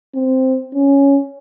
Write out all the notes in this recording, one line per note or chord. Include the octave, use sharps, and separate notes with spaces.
C4
C#4